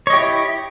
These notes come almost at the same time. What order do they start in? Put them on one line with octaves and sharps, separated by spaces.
C#5 D#5 G4 E4